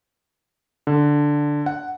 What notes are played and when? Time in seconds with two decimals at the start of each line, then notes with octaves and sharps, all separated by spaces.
0.87 D3
1.66 F#5